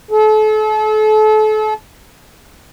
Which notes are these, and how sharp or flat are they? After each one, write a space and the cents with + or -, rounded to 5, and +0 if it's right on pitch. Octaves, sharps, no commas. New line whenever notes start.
A4 -35